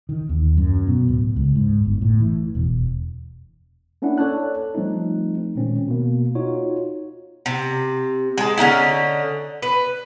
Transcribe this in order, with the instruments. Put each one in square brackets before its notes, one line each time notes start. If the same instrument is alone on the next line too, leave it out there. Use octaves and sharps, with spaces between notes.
[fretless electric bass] D#3
D#2
F#2
B2
D1
C#2
G#2
G1
A2
E3
E1
[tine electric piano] A#3 C#4 D4 E4 F#5
A4 C#5 D5 A5 F#6
F3 G3 A3 C4 D#4
A#2 D#3 G#3 C4 C#4
B2 A#3
D#4 F4 F#4 C#5
[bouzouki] C3
G#3 A5
D3 C#4 D#4 E4
B4